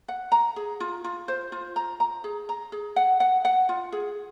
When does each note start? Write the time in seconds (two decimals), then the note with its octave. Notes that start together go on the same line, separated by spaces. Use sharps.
0.08 F#5
0.32 A#5
0.56 G#4
0.80 F4
1.04 F4
1.28 C5
1.52 F4
1.76 A#5
2.00 A#5
2.24 G#4
2.49 A#5
2.72 G#4
2.96 F#5
3.20 F#5
3.45 F#5
3.69 F4
3.92 G#4